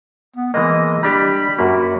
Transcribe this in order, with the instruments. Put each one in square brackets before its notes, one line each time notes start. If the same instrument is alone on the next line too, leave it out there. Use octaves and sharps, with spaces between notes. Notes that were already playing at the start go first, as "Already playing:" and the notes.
[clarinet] B3
[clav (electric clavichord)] E3 G#3 A#3 [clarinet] D#5
[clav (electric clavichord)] G3 D4 G4 [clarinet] B5
[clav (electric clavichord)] F#2 A#3 [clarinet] F#4